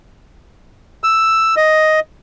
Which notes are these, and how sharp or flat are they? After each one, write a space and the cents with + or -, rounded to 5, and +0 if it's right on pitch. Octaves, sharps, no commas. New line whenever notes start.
E6 +5
D#5 +5